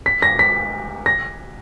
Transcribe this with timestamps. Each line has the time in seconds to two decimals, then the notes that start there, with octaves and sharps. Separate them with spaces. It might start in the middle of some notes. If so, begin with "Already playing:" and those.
0.06 B6
0.22 A#6
0.39 B6
1.06 A#6